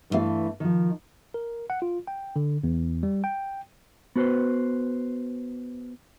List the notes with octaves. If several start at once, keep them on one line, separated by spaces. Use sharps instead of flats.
G2 D#3 E3 A3 F5
D#3 F3
A#4
F#5
F4
G5
D3
E2
G3
G5
B3 F#4 B4 C5